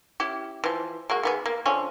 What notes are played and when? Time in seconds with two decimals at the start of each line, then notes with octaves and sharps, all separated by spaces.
0.20 C#4 E4 G4
0.64 E3 F3
1.10 G#3 A#3 F#4
1.23 D#3 B3 G#4
1.46 A#3
1.66 D3 F3 C#4